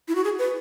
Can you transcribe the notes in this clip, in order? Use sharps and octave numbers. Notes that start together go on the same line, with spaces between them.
E4
F#4
G#4
B4